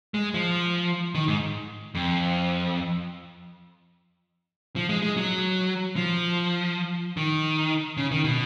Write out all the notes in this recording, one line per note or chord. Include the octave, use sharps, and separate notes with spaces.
G#3
F3
D#3
G#2
F2
F3
G#3
G#3
F#3
F3
D#3
C#3
D#3
B2